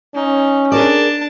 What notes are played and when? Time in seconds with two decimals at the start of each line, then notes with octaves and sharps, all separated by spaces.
0.15 C#4 D#4
0.72 D4 G#4 A#4 D5 A5